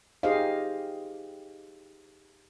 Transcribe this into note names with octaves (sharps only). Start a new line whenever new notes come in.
D#4 G4 G#4 C5 D#5 F5